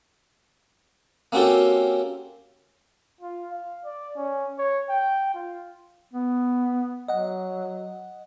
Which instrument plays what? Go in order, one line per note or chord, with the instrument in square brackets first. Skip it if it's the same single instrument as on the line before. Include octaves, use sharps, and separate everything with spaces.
[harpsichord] A#3 C4 C#4 F#4 G4 A4
[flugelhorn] F4
F5
D5
C#4
C#5
G5
F4
[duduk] B3
[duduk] F#3 [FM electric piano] D#5 F#5